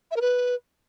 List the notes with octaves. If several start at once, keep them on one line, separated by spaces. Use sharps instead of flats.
E5
A#4
B4